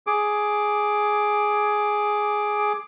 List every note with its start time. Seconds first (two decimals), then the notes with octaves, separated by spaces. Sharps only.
0.07 G#4 D6